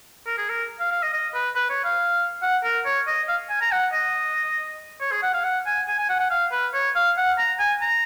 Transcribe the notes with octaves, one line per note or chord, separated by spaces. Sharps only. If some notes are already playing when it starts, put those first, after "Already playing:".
A#4
G#4
A#4
F5
F5
D#5
D#5
B4
B4
C#5
F5
F#5
A#4
C#5
D#5
F5
G#5
A#5
F#5
D#5
C#5
G#4
F#5
F5
F#5
G#5
G#5
G#5
F#5
F#5
F5
B4
C#5
F5
F#5
A#5
G#5
A#5